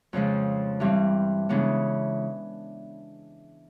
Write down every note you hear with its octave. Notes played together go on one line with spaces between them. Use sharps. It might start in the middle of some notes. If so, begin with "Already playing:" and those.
F2 C#3 F3 G#3
G2 E3 G3 C4
C#3 E3 G#3 B3 D4